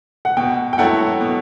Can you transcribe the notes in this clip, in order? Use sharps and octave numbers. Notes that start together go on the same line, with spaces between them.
F#5
B2 G5
G5
F#3 A3 E4 F#5
B2